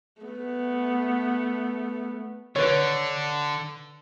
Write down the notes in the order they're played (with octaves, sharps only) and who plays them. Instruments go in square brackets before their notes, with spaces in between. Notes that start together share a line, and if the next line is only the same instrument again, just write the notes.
[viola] A3 B3
[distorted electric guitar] D3 [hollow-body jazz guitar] B4 C#5